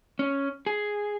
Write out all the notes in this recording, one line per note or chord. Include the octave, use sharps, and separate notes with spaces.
C#4
G#4